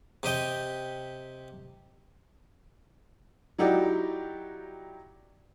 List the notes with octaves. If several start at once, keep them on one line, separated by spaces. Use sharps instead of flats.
C3 G4 D#5 G5
F#3 D#4 E4 F#4 G4 D5